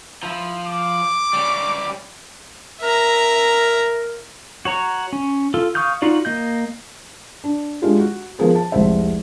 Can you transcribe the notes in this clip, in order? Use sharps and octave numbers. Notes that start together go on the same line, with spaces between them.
F3 E4
D6
G3 C#4
A#4 E5 A#5
F#4 C#5 A#5
C#4
F4 A4
F5 C#6 D#6 F6 G6
D#4 F4 F#4 D5
A#3 D#5 G6
D4
G#3 D4 E4 F4 G4
F#4
F3 B3 F4 G#4 A#4 C5
A5
F1 C2 G3 G#3 C5 E5